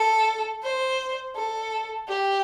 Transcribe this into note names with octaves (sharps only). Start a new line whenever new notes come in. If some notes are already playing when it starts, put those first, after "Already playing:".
Already playing: A4
C5
A4
G4